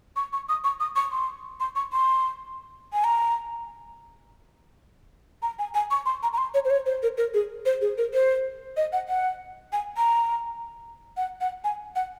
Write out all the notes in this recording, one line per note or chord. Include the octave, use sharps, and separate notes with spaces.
C#6
C#6
D#6
C#6
D#6
C#6
C6
C6
C#6
C6
G#5
A#5
A#5
G#5
G#5
C#6
C6
A#5
A#5
C6
C#5
C5
C#5
C5
A#4
A#4
G#4
C5
G#4
A#4
C5
D#5
F#5
F#5
G#5
A#5
F#5
F#5
G#5
F#5